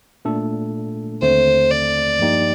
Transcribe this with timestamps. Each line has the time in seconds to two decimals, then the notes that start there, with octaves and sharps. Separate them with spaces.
0.25 A#2 A3 D4 A4
1.22 D#2 D3 A3 C4 C5
1.71 D5
2.19 G2 F3 A#3 D#4 G4